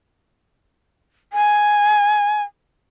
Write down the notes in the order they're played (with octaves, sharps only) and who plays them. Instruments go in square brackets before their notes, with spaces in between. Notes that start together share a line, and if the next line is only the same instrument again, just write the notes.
[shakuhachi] G#5